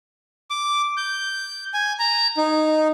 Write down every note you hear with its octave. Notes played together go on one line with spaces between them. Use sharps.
D6
G6
G#5
A#5
D#4